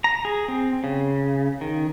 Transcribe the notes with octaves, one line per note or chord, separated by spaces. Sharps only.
A#5
G#4
C4
C#3
D#3